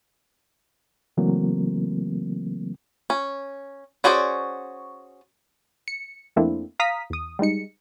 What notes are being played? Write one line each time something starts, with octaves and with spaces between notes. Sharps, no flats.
C#3 E3 F#3 A3 A#3 C4
C#4
C#4 F#4 G#4 C5 D5
C#7
F2 A3 A#3 C4 D4 E4
F5 A#5 D#6 B6
E2 D#6
G3 G#3 D#4 C#7